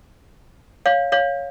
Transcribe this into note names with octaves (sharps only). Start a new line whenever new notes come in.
C#5 F5
C#5 F5